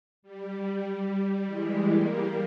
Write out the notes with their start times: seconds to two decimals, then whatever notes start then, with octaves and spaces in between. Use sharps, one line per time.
0.22 G3
1.46 E3 G#3
1.87 G3 A#3